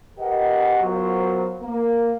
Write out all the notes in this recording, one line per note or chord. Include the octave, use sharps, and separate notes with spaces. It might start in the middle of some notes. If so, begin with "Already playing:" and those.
G4 G#4 A#4 B4 D#5 F#5
F#3 B3 F4 A#4 C5
A#3